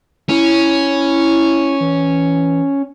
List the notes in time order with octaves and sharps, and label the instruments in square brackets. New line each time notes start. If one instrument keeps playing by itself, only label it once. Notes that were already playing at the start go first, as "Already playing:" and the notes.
[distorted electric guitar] C#4 [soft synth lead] E4
[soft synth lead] E3